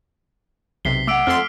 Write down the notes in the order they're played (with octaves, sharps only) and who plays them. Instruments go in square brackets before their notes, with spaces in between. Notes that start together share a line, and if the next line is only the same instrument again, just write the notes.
[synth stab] B1 C3 [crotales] B6 C7 G7
[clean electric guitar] A3 F#5 [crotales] D6 E6 D7
[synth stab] F2 A4 C6 [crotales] F6